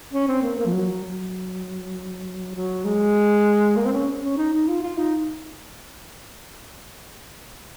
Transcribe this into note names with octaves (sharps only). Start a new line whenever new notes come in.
C#4
C4
A#3
A#3
F3
F#3
F#3
F#3
G#3
A#3
C4
C#4
C#4
D#4
D#4
F4
F4
D#4